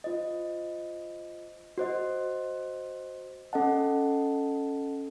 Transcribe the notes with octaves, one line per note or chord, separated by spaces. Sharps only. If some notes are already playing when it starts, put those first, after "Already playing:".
F4 C5 D#5
F#4 C5 D#5
C#4 A4 D#5 F#5 A5